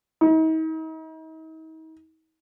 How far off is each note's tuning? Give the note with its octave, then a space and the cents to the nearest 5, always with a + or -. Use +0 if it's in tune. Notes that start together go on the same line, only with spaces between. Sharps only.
D#4 +40